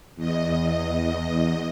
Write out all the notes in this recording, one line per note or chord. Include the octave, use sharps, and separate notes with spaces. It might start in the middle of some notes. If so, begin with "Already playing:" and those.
E2 D#5